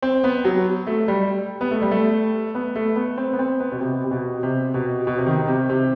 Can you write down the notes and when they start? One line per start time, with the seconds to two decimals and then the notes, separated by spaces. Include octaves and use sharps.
0.02 C4
0.24 B3
0.45 F#3
0.87 A3
1.08 G3
1.61 B3
1.71 A3
1.82 G3
1.91 A3
2.55 B3
2.75 A3
2.96 B3
3.17 C4
3.33 B3
3.39 C4
3.60 B3
3.72 B2
3.81 C3
4.04 C3
4.11 B2
4.43 C3
4.74 B2
5.07 B2
5.18 C3
5.26 D#3
5.48 C3
5.69 C3